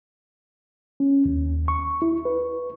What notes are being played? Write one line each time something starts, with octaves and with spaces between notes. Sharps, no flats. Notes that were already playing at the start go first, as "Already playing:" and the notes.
C#4
D#2
C#6
E4
B4